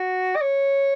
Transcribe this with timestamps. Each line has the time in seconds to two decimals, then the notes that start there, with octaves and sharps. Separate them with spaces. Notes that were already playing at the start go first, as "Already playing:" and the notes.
Already playing: F#4
0.35 D#5
0.41 C#5